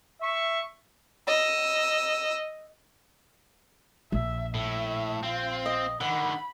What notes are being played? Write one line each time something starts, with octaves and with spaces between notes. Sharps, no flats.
E5 C#6
D#5 E6
A#1 E5
A2 E5
C4 F4
D#5
D3 D#3 F#5 B5